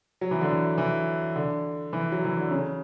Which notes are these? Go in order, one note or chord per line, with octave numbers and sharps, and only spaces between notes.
F#3
E3
D3
E3
E3
D3
E3
F#3
E3
D3
C#3